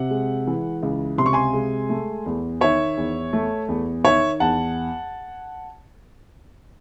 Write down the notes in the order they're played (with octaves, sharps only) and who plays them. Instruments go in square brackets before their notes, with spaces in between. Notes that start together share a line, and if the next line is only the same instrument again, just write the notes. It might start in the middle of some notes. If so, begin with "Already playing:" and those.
Already playing: [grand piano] C3 F#5
G#3
E3
C#2
C3 C6
C#6
G#5 C6
G#3
A3
E2
D#3 C#5 E5
E2
A3
E2
D#3 C#5 E5
E2 F#5 A5